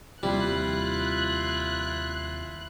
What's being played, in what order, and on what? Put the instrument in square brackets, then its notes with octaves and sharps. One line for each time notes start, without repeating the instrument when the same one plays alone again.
[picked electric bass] D#2 C3 F3 [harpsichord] G3 [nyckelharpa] E4 F4 [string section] F#6